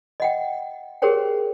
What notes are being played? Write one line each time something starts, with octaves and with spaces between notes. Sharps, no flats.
D#5 F#5 G5
G4 G#4 A#4 C5 C#5 G5